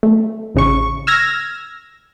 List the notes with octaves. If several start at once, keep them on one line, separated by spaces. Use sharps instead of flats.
A3
A1 C#3 C#6
E6 F6 G#6 A#6